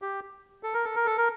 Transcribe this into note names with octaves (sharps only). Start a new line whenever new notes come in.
G4
A4
A#4
A4
A#4
A4
A#4